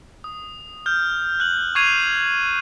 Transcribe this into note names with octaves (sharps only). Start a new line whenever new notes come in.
D#6
F6 G6
F#6 F#7
C#6 D6 G#6 C7 D#7 F7